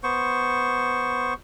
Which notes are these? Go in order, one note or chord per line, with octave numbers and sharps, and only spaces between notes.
B3 C5 C#6